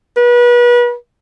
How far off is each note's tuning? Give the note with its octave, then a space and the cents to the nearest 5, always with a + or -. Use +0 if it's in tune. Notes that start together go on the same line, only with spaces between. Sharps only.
B4 -35